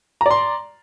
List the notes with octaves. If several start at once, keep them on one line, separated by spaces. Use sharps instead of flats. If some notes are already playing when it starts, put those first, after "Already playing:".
D5 A#5 C6